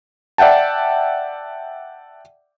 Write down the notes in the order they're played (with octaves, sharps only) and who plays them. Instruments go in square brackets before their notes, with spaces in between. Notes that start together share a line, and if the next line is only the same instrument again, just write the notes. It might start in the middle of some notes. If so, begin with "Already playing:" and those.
[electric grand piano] D5 E5 F#5 G5 A5